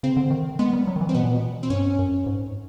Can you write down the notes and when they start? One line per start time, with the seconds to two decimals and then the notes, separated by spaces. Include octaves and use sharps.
0.03 C#3 C4
0.17 D3
0.31 D#3
0.59 G#3 B3
0.73 G3
0.87 F#3
0.96 D#3
1.01 E3
1.09 C4
1.15 B2 B3
1.24 A#2
1.33 B2
1.63 C4
1.70 G2 C#4
1.99 F#2
2.26 G#2